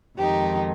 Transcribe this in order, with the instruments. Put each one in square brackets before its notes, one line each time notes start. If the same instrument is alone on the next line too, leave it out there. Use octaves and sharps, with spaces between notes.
[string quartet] F2 D#3 G#3 D#4 G4